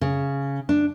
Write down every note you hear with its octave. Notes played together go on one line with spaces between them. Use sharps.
C#3
D4